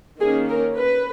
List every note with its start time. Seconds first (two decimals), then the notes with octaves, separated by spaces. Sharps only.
0.19 D#3 A#3 C#4 G#4
0.49 A#4
0.78 B4